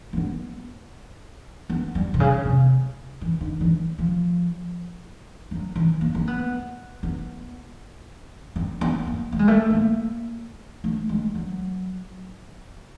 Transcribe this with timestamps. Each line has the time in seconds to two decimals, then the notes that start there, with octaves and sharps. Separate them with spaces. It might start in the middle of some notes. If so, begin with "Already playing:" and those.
0.13 A#3
0.17 B3
1.70 B3
1.95 G3
2.14 C3
2.20 C#3
2.45 C3
3.21 E3
3.41 D#3
3.61 E3
3.98 F3
5.51 F#3
5.76 E3
6.01 A#3
6.15 C4
6.27 B3
7.03 B3
8.56 C4
8.81 B3
9.07 A#3
9.32 A3
9.39 G#3
9.48 A3
9.70 A#3
10.84 A3
11.09 G#3
11.35 F#3